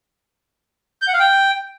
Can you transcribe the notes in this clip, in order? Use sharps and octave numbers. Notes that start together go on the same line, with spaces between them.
G6
F#5
F5
G5